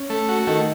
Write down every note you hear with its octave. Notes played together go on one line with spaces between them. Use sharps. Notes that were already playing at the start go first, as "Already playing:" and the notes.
Already playing: C#4
A3
F#4
D#3 A3